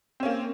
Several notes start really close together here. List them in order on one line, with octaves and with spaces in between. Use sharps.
C4 C#4 A#3